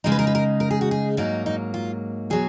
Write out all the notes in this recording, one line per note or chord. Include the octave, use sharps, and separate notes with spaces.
C#3 G#3 D#4 A#4
B4
A#4
B4
A#4
A#4
G#4
F#4
G#4
G#2 F#3 A#3 D#4
D#4
F4
B2 F#3 G#4